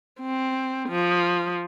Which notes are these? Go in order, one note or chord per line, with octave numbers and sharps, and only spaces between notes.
C4
F3